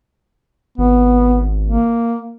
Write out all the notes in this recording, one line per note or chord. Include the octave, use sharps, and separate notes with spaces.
G#1 B3
A#3